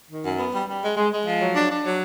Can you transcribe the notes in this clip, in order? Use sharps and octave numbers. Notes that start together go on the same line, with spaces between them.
D#3
F#2
B3
G3
G3
G#3
G#3
G#3
F3
F#3
D4
D4
F#3